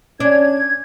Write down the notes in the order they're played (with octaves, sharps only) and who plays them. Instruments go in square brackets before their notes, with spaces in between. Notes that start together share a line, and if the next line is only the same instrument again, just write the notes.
[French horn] C#4 [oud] D4 [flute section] G#6